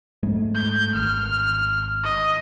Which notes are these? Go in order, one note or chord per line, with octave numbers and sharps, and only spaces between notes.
G#2 G#3 A3
G6
G#1 F6
D#5